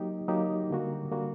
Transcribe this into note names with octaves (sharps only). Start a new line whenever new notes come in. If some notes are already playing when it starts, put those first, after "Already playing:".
Already playing: F#3 A#3 D#4 G4
F#3 A#3 D#4 G4
D3 G3 A#3 F#4
D3 G3 A#3 F#4